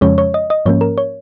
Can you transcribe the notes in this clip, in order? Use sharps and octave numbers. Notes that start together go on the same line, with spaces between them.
F2 C#3 F3 G#3 C#4 C#5
C#5
D#5
D#5
G#2 F3 A#3 C#4 C#5
A#4
C#5